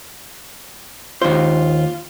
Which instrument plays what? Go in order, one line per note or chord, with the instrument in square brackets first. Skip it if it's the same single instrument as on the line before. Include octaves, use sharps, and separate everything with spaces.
[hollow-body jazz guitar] D#2 C5 [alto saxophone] F4